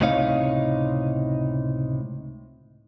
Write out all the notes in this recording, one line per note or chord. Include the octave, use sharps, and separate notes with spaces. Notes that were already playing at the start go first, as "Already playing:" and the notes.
C#2 A2 C3 D#4 C#5 F5